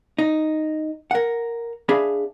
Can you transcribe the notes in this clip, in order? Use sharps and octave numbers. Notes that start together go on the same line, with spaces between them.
D#4
A#4 F#5
D4 G#4 E5 F5 B5